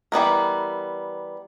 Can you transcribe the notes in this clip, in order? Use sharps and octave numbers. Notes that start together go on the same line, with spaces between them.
E3 G3 B3 A#4